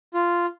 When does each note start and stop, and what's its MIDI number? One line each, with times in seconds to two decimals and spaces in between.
0.14 0.46 65